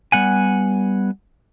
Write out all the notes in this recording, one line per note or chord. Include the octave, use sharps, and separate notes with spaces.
G3 B3 F#5 G#5